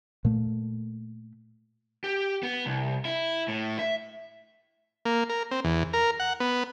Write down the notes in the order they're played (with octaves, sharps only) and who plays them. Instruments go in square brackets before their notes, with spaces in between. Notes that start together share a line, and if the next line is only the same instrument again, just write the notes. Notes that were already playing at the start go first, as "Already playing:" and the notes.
[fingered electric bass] A#2 A3
[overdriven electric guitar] G4
B3
C2
E4
A2
E5
[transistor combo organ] A#3
A#4
C4
E2
A#4
F#5
B3